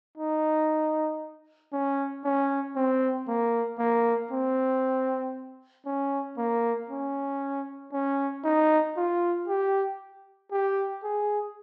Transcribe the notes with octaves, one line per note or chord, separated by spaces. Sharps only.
D#4
C#4
C#4
C4
A#3
A#3
C4
C#4
A#3
C#4
C#4
D#4
F4
G4
G4
G#4